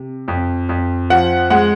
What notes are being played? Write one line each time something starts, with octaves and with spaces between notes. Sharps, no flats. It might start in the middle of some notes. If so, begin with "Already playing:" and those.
Already playing: C3
F2
F2
F3 F#5
G#3 F#5